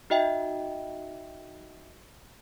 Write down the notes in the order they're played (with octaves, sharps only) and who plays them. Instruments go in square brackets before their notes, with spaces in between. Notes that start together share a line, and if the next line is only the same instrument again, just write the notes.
[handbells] D#4 F#4 D#5 E5 G5